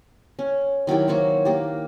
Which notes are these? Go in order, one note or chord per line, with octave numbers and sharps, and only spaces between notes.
C#4
D#3 F#3 E4 G4
A#3 F#4 C5 C#5
A#3 G4